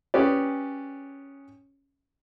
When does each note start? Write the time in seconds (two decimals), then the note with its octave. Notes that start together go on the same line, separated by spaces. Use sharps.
0.14 C#4 G4 G#4 B4 D5